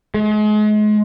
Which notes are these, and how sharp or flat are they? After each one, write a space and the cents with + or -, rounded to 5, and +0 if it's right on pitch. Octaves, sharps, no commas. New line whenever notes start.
G#3 +35